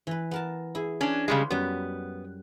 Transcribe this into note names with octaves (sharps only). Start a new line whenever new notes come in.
E3 B4
B3 A#4 A5
E4 G#4
C#4 D4
C#3 G3 G#3
F#2 G3 B3